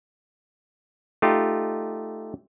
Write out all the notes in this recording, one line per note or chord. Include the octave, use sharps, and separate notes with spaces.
A3 D#4 F4 G4